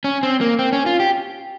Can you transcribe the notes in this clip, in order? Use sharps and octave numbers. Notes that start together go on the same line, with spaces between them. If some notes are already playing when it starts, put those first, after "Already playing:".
C#4
C4
A#3
C4
C#4
F4
G4